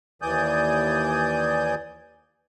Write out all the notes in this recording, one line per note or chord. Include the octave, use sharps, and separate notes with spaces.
D#2 E3 D5 G#5 D#6 G6